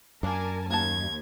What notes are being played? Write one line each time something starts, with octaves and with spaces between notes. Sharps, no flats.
F#2 A#3 D4 F4 A#4 G#5 A5
D#2 A#4 F#5 A5 G#6